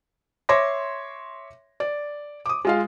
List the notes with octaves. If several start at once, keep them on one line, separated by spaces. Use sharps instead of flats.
C#5 E5 C6 D6 A#6
D5
D6 D#6
G#3 F4 F5